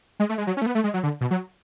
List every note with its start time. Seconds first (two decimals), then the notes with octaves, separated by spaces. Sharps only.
0.20 G#3
0.29 A3
0.38 G#3
0.47 F#3
0.57 C#4
0.62 A3
0.66 B3
0.75 A3
0.84 G#3
0.94 F#3
1.03 D3
1.21 B2
1.31 F#3